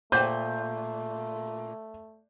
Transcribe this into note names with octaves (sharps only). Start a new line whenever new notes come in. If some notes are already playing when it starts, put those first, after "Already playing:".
A#2 A3 C5 F#5 G5 G6